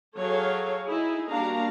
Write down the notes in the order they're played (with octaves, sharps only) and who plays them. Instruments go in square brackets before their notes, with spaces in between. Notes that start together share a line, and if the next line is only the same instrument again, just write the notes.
[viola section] F#3 G#4 A4 C#5 F5
D#4 E4 G#4
G3 A#3 D4 F#4 F5 A#5